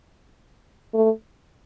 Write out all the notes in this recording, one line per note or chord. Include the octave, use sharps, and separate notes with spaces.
A3